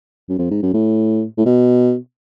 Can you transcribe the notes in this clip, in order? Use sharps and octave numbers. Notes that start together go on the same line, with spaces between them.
F#2
F2
G#2
F#2
A2
A2
B2